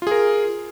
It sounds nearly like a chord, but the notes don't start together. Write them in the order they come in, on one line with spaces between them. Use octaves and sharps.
F4 G#4 A#4